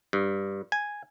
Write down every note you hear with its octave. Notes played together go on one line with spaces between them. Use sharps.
G2
G#5